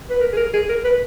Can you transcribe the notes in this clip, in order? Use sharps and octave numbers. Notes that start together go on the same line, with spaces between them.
B4
A#4
G#4
A#4
G#4
A#4
B4